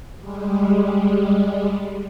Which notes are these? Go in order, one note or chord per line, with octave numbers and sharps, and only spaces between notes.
G3 G#3